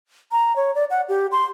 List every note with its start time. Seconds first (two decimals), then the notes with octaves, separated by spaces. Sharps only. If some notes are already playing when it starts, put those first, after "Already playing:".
0.32 A#5
0.56 C#5
0.75 D5
0.90 F#5
1.09 G4
1.32 C6